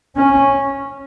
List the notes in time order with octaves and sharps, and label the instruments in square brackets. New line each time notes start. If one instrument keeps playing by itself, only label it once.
[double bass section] C#4